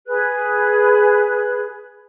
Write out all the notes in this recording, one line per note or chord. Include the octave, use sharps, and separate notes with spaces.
G#4 B4 F#6